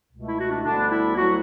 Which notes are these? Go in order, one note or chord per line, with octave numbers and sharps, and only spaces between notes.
C#2 B2 A3
E4
F#4
D4
D2 D3 G3 B3 D4
E4
D2 D3 F#3 B3 F#4